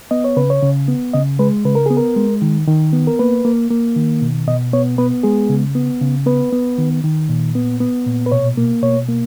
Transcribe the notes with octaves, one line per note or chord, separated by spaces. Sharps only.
B3 D#5
C#5
C#3 B4
C#5
C#3
B3
C#3 D#5
G#3 B4
C#3 B4
A#4
B3 G#4
A#4
G#3
D#3
D#3
B3
A#4
A#3 B4
A#3
A#3
D#3
B2
B2 D#5
B3 C#5
B3 B4
G#3 G#4
C#3
B3
C#3
B3 B4
B3
D#3
D#3
A#2
B3
B3
A#2
B4
B2 C#5
A#3
B2 C#5
A#3